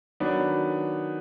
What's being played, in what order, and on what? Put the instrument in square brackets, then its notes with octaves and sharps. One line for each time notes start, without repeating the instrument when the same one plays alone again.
[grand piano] D#3 F#3 B3 D4